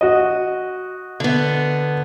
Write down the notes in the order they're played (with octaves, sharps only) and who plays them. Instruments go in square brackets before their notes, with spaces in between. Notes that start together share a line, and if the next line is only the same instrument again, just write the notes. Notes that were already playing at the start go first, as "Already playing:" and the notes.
[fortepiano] F#4 D#5
[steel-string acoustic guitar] D3 B3